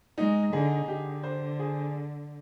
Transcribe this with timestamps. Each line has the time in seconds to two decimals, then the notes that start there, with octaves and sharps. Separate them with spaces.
0.18 G#3 D#4
0.53 D3 G#4
0.88 D3 G4
1.23 C5
1.59 G#4